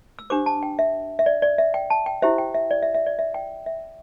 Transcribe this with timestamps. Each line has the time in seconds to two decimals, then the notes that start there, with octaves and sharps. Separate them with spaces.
0.19 E6
0.30 D4 G4 C5 D6
0.46 A5
0.63 G5
0.79 E5
1.19 E5
1.26 D5
1.42 D5
1.58 E5
1.74 G5
1.90 A5
2.06 G5
2.22 E4 G4 C5 E5
2.38 G5
2.54 E5
2.71 D5
2.83 E5
2.94 E5
3.06 D5
3.19 E5
3.34 G5
3.66 E5